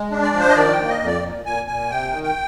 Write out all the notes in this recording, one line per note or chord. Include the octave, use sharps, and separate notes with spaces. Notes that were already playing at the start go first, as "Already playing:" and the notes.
Already playing: G#3
D4
D5
F3
C5
D#5
D#3 D5
G5
A#3
D#5
F2
D5
A#2
A#2 G#5
A#2 G#5
C3 G5
D#3
G5